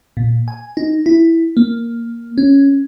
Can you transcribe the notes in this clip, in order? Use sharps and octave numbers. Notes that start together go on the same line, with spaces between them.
A#2
G#5
D#4
E4
A#3
C#4